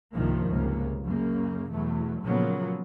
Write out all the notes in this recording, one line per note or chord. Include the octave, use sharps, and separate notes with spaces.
C2 G2 C3 D#3 F3 A#3
C#2 C3 A#3
F#2 C#3 A#3
E2 B2 F#3 A3
A#2 C#3 F3 F#3 A#3 B3